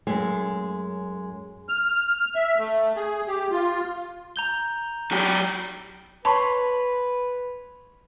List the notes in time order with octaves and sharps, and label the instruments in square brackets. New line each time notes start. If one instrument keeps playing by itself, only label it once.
[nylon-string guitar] F#2 G#3 A3
[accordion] F6
E5
A3
G#4
G4
F4
[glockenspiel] A#5 G6 G7
[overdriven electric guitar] F#3 G4
[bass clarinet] B4 [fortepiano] C#5 B5 C6 [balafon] A5